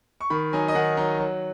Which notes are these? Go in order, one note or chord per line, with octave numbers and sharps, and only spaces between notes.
C#6
D#3 B5
F#3 D#4 G#5
D#5
D#3 F#5
F#3 D#4
F#3